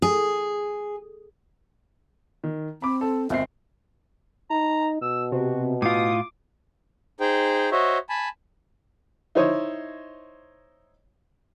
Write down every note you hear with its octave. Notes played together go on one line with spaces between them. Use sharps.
G#4
D#3
C4 B5 D6
A4
G#1 C4 E5 C7
D#4 A#5
B2 E6
C3 F#4
A2 F4 D6 D#6
D#4 G#4 C5 G5
F#4 C5 C#5 D#5 E5
G#5 A5 B5
D#4 E4 C5 C#5 D#5